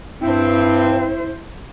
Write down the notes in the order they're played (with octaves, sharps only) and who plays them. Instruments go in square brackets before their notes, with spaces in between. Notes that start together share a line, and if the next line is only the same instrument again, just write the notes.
[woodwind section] G2 C4 [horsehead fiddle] E4 C5